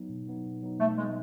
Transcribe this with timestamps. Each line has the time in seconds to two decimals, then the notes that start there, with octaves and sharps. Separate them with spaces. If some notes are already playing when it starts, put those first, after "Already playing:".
Already playing: F#3 B3 D#4
0.10 B2
0.27 F#3 B3 D#4
0.44 B2
0.62 F#3 B3 D#4
0.80 B2 A3
0.98 F#3 G#3 B3 D#4